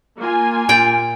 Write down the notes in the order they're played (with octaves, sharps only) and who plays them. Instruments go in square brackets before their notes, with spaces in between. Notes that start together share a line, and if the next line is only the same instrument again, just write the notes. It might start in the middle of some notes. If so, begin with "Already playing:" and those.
[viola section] A#3 F4 G#5
[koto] A#2 G5